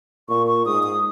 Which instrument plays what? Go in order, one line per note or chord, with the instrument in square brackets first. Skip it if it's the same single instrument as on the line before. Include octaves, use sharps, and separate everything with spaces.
[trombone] A#2 [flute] C#6
[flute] C#6
[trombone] G#2 [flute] D#6
[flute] D#6